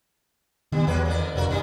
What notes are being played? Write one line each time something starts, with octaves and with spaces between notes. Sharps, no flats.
D#3 G3 B3
E2 F#3 G#3 B4
F2 D#3 D5
F1 C#3 F#4 A#4
F#1 D#3 G3 D#4